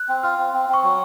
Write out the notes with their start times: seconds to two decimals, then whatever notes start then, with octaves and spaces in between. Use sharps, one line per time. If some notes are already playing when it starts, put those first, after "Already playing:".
Already playing: F#6
0.09 C4
0.23 F4 F6
0.38 C4
0.54 C4
0.69 C4 C#6
0.83 F#3